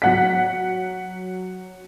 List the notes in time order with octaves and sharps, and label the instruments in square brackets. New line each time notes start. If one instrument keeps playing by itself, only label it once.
[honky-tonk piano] F#3 F#5 B6